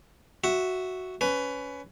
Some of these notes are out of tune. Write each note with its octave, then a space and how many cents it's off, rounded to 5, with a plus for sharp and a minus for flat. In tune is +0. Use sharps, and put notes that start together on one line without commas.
F#4 +0 E5 +0
C#4 +20 B4 +15